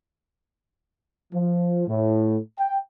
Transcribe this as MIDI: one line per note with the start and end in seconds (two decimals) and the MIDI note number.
1.32 1.85 53
1.88 2.36 45
2.58 2.77 79